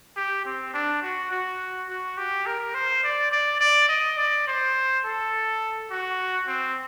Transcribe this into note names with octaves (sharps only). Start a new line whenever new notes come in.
G4
C4
D4
F#4
F#4
F#4
G4
A#4
C5
D5
D5
D5
D#5
D5
C5
A4
F#4
C4